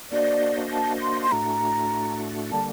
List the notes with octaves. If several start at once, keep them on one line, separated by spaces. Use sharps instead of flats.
A#3 D4 F#4 C5 D5 D#5
A5
C6
C6
A2 A3 D4 F#4 A#5
D3 G3 A#3 A5